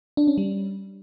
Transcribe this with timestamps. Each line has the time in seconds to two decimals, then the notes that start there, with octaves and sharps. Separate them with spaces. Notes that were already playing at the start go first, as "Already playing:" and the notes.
0.17 D4
0.27 C#4
0.38 G3